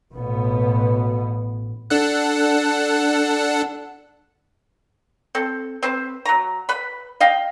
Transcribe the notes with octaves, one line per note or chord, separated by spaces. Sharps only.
A1 B2 B3
D4 A4 F#5
C4 A4
C4 B4 C5
F#3 A#5
B4 B5
D#5 F5 G5